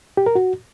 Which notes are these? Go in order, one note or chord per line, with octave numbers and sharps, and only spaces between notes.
G4
A#4
F#4